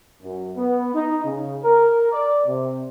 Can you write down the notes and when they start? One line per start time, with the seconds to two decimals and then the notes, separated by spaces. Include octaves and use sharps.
0.22 F#2
0.56 B3
0.94 D#4
1.24 C#3
1.62 A#4
2.11 D5
2.47 C3